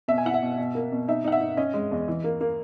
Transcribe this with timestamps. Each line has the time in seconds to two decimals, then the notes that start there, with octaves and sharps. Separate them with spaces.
0.08 B2 E5
0.18 G#5
0.25 E4 F#5
0.34 E5
0.42 B2
0.58 B2
0.75 A#3
0.92 B2
1.08 D#4 E5
1.24 D#4 F#5
1.32 E5
1.41 D#4
1.57 C#4 D#5
1.74 G#3
1.91 E2
2.08 E3
2.24 A#3
2.41 A#3